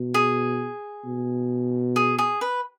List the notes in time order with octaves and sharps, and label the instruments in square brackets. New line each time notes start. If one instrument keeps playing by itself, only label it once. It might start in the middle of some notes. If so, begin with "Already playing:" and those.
Already playing: [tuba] B2
[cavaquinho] G#4
[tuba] B2
[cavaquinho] G#4
G#4
B4